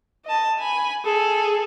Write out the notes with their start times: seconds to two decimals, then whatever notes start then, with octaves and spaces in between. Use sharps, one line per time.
0.25 D#5 A5
0.58 G#5 B5
1.05 G#4 A4